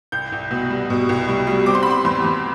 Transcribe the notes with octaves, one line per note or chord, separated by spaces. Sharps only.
C2 G6
C2
B2
G3
B2
C2
G3
G3
C4 D6
C6
B5
G3 C6
E2 C6
E2